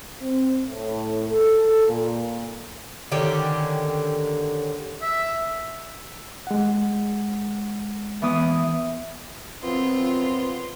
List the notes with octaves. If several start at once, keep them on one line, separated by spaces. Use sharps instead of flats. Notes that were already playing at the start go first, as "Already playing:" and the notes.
C4
A2
A4
A#2
D3 D#3 C#4 G4
E5
G#3 F#5
E3 B3 D#6
F#2 F3 B3 C4 F4